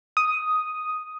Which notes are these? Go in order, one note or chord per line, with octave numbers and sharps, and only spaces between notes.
D#6